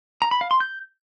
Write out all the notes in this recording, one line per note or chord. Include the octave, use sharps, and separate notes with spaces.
A#5
B5
F5
C6
G6